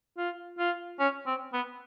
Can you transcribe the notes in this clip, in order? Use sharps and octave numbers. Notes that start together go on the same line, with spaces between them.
F4
F4
C#4
C4
B3